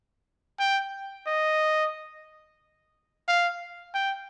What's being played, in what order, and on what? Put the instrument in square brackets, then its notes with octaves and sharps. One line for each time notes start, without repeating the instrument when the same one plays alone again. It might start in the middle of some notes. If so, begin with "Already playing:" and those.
[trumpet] G5
D#5
F5
G5